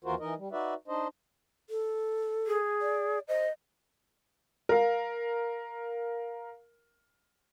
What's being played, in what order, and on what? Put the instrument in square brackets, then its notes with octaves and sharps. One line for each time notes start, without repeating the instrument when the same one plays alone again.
[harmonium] D#2 E3 F4 F#4 A#4 C5
E3 D#4 A#4 D#5
G3
D#4 F#4 B4 D5 E5
D4 D#4 C5 D#5
[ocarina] A4
[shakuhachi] G#4
[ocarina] D5
[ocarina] C5 [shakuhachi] D#5
[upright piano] A#4 F5